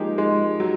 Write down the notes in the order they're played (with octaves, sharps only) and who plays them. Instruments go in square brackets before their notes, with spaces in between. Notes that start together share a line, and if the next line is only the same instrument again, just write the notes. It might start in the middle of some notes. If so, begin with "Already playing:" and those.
Already playing: [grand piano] F3 A#3 D#4 G4 [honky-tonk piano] G#3
[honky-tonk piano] G#3
F#3